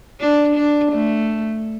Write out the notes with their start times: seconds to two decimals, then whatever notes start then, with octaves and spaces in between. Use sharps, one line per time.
0.20 D4
0.56 D4
0.92 A3